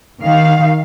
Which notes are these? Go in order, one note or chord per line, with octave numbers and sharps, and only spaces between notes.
D#3 F5